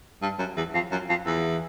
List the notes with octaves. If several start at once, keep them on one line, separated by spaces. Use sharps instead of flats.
G2
F#2
E2
F2
F#2
F2
E2